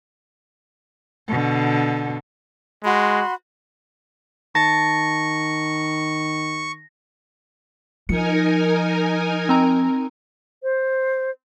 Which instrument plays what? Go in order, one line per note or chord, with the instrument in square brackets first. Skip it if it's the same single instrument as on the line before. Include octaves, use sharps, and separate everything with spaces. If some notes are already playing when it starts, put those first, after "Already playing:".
[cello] B2 D3
[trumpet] G#3 [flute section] F#4 B5 C6
[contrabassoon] D#3 [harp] A5 [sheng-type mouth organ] C#6 [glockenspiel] A#6
[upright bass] F3 [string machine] D#4 A#4 G#5 [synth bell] C#7
[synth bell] C4 A#5
[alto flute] C5